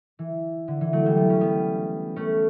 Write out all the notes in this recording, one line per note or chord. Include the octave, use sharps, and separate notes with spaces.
E3
D3
E3
F#3 A3
E3 G3
B3
C#4
G3 B3
A3 C#4